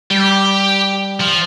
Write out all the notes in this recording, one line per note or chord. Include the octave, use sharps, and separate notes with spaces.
G3 G4
F3